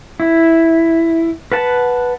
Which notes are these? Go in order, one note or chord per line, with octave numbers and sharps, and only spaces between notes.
E4
B4 F#5 A5